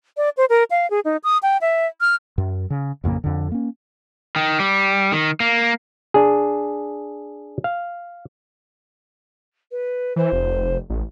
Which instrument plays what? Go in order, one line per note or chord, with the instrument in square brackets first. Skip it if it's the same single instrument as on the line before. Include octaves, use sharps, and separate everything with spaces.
[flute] D5
C5
A#4
F5
G#4
D#4
D#6
G5
E5
F6
[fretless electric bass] F#2
C#3
A1 F2 C#3 A#3
F2 D3
A#3 C#4
[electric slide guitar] D#3
G3
D#3
A#3
[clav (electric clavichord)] D4 G#4
F5
[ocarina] B4
[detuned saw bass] E3 [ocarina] C5
[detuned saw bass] F1
A1